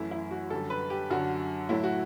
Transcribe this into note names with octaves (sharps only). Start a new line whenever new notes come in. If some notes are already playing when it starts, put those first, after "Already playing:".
Already playing: F#2 E3 A3 E4
E4
F#4
F#2 D3 G3 A4
B4
G4
F#2 D3 F#3 F#4
A2 F#3 A3 E4
F#4